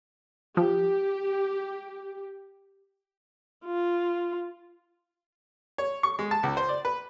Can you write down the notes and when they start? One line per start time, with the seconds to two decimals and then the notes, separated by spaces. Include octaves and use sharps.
0.57 F3 G4
3.65 F4
5.78 C#5
6.03 C#6
6.19 G#3
6.31 A5
6.43 C#2
6.57 C5
6.69 D5
6.85 B4